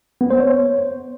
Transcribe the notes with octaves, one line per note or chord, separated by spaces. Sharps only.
B3
C5
C#5